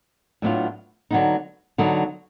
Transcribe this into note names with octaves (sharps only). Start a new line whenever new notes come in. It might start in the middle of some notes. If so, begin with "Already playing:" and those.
A2 F#3 B3 D4 F4
D3 F#3 B3 D#4
D3 F#3 B3 D#4